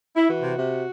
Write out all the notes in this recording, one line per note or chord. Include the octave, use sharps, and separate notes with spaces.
E4
E3 F#4
C3
C3